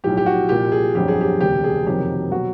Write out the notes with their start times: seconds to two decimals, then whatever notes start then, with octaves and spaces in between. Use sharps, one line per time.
0.04 B1 A2 F3 G4
0.17 G4
0.26 F#4
0.49 C2 A#2 F3 G4
0.72 G#4
0.95 G1 F2 D3 F#3 G4
1.08 G#4
1.21 G4
1.40 E1 D2 C3 G4
1.64 G#4
1.86 F#1 F2 C3 D#3 F#3 G4
2.31 B2 F#3 F#4